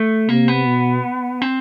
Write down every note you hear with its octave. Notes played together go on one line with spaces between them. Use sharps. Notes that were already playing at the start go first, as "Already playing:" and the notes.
Already playing: A3
C3 A#3
B3
B2
C4